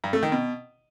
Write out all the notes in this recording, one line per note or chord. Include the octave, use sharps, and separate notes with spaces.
G2
A3
D#3
B2